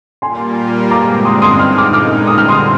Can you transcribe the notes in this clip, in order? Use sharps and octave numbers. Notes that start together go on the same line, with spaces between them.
A#2 G3 A#3 F4 G#5 C6
G2 D3 G#3 C4 A#5 D6
C6 D#6
C6 D#6
A#2 G#3 D#4 F6
D6 F6
D6 F6
D3 G3 C4 D#6
F6
C6 D#6